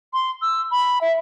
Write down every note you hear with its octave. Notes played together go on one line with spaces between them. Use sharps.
C6
E6
B5
E5